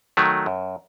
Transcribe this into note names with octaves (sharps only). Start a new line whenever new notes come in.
D#3 F#3 A3
F#2